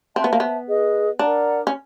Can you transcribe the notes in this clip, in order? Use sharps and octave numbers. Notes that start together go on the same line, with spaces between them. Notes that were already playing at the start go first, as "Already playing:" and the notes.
C4 C5 E5 A5
B3
A#3
B3
G#4 B4 D#5
D4 A#4 D5 F#5 A#5
C#4